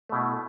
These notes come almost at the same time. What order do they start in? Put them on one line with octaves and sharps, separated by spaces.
A3 B2 E4